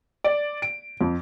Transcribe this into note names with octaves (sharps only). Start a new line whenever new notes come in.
D5
D7
F2